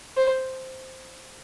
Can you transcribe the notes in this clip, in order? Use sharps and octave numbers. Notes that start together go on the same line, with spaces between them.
C5